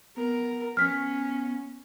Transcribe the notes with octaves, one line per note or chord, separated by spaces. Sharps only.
B3 A#4
C#4 F6 B6